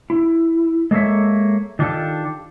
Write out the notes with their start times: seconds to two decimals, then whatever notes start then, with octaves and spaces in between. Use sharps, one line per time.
0.10 E4
0.91 G#3 A#3 A4 C#5 E5
1.79 D#3 D4 F4 G4 A4